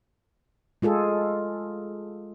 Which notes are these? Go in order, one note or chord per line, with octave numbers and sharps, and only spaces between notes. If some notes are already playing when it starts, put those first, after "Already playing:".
G#3 F4 G#4 A4